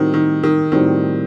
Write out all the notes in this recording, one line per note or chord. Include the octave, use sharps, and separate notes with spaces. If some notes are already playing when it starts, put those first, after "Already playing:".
Already playing: A2 D#3 G3 C4 F#4
D#3
D#3
A2 D#3 G3 C4 F#4